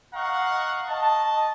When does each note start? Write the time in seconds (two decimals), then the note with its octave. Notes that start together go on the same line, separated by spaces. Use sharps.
0.13 D#5 F5 F#5 A#5 C#6
0.88 D#5 A5